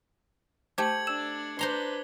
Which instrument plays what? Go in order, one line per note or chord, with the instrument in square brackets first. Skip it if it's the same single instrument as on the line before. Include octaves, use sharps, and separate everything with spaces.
[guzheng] A3 G4 [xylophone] C5 A5 [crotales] G#6 C#7 F#7
[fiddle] D4 D5 [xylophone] E6 E7
[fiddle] D4 B4 [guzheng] C5 A#5 C6 [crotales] D6 G7